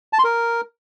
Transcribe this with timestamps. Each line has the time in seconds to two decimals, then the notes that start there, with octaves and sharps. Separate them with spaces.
0.13 A5
0.19 C6
0.24 A#4